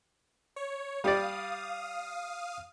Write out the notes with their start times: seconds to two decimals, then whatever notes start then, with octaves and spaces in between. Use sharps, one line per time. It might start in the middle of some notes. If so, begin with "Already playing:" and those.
0.56 C#5
1.04 G3 G4 D5 F5 D#6